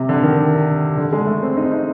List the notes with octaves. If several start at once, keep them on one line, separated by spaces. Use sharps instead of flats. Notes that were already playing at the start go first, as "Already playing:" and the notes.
Already playing: C3
D3
D#3
D3
G#3
A3
C4
D#4
D#4